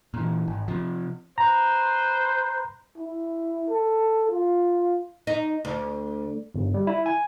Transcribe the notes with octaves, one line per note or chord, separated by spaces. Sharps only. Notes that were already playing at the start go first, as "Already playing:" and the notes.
A#2 E3
G#1
C3 F3
B4 C5 A#5
E4
A4
F4
D#4
D2
G1
G3
E4
G#5